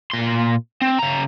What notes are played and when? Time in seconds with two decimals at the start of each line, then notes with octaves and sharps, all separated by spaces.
0.11 A#2 C6
0.81 C4
0.99 C#3 A#5